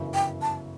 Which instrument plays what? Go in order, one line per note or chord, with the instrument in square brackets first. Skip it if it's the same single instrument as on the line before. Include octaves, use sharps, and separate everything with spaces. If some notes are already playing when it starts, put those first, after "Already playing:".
Already playing: [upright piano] G1 F#2 C#3 E3
[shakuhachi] G5
A5